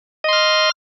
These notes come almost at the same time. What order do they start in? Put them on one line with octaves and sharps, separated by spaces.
D#5 C6 F6